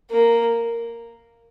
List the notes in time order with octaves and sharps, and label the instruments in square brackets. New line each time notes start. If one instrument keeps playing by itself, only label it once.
[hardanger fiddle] A#3